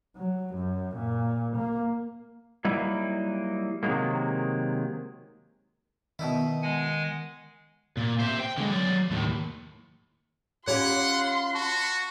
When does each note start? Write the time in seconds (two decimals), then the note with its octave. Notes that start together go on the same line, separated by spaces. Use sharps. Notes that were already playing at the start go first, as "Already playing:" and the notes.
0.17 F#3
0.55 F#2
0.96 A#2
1.57 A#3
2.65 F#3 G3 A#3 D#4 E4
3.83 C3 D#3 F#3 G#3 A#3
6.19 B2 D#3 D#4 E4
6.62 G#3 F#5 G#5
7.97 A#2
8.20 C5 E5
8.40 G5
8.58 D3 G#3
8.70 F#3 D5
9.11 D#2 A2
10.68 C#4 F4 G4 F#5 B5 C6
11.55 F#4 A5 C#6